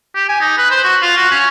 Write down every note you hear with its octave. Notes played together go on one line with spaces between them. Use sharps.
G4
G#5
D#4
B4
C5
F#4
F4
F#4
C#4